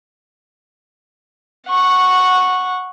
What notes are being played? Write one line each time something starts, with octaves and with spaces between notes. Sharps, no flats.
F#5 C#6